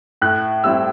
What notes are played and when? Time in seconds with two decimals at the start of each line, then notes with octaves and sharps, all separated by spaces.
0.22 A2 F#6
0.64 G3 C4 E4 E6